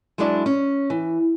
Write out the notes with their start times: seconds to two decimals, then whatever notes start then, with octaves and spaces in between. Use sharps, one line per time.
0.18 F#3 G#3 B3 D4 E4 D5
0.46 C#4
0.90 E3